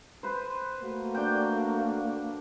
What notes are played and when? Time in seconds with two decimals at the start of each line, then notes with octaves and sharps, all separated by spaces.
0.23 B4 C5
0.81 A3 A#3 F#4
1.15 D4 G5